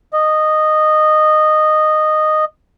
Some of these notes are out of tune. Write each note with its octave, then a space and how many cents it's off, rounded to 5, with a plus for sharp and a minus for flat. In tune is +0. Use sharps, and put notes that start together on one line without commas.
D#5 -10